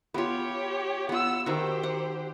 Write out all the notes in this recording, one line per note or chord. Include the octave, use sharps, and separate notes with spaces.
B3 F4 G4 C#5
B3 F4 F#5 E6
D#3 F#4 G4 C5
F#5